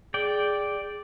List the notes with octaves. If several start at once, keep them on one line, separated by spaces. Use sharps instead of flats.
G#4 D5 G5